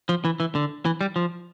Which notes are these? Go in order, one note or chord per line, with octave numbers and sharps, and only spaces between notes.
F3
E3
E3
D3
E3
G3
F3